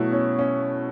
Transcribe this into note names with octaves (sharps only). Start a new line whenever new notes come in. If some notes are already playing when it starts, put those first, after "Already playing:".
Already playing: B2 F#3 A3 E4
C#4
C#4